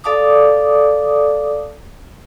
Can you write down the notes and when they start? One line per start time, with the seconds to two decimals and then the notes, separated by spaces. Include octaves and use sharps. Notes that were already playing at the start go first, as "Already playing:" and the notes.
0.04 A4 D5 F5 A5 D6 D#6